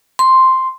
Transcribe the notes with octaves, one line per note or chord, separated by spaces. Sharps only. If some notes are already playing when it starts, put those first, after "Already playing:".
C6